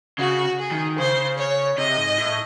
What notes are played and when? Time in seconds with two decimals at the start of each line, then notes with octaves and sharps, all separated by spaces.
0.19 C#3 F#4
0.59 G#4
0.71 D#3
0.99 C#3 C5
1.38 C#5
1.78 C3 D#5
1.98 G#2
2.18 A2